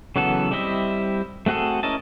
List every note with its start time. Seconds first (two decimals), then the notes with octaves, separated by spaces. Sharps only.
0.16 C#3 E3 F#3 B3 A4
0.51 G3 C4 E4 D#5 E5
1.46 A3 C4 F#4 G#4 A4
1.83 C#4 E4 A#4 D#5 A5